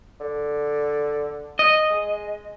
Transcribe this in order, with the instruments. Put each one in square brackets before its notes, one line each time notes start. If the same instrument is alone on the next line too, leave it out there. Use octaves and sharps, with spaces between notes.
[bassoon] D3
[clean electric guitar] D#5
[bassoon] G#3